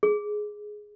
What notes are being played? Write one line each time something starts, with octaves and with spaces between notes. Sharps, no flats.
G#4